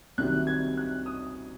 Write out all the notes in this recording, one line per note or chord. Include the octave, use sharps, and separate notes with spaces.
C2 C3 D#3 F#3 C4 F#6
G#6
F#6
D#6